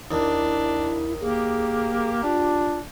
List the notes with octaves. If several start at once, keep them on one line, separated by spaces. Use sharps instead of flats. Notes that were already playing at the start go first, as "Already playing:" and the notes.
D#2 D4 E4
A#3 G4 G#4
D4 F4